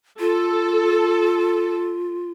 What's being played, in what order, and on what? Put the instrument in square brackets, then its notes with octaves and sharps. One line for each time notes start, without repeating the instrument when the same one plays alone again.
[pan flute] F4 [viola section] A4